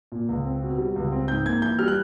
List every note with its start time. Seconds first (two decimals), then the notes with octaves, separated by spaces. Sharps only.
0.12 A#2
0.29 C#2
0.44 C4
0.62 B2
0.78 G3
0.96 C#2
1.12 C4
1.28 G#2 G6
1.45 A#3 G#6
1.62 E3 G6
1.79 G3 F6
1.88 F#6